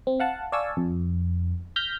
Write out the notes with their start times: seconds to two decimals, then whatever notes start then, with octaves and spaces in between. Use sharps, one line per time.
0.07 C4
0.20 F5 F#5 A5
0.52 D5 F5 G#5 A5 C#6 E6
0.77 F2
1.76 F6 G6 A#6 B6